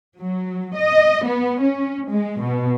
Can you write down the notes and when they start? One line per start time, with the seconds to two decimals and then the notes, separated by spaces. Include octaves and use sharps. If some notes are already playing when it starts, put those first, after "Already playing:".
0.20 F#3
0.75 D#5
1.25 B3
1.60 C#4
2.10 G#3
2.42 B2